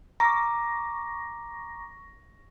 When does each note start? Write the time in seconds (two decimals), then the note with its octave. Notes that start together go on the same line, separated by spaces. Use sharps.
0.20 A#5 C#6 D6 A#6